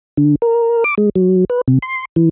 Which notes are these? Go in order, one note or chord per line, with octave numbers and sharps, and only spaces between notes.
D3
A#4
D6
G#3
F#3
B4
C3
C6
E3